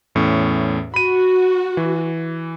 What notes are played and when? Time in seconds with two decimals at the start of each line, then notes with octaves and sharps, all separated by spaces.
0.15 E2 A2 C#4
0.94 F#4 B5 D#7
1.77 E3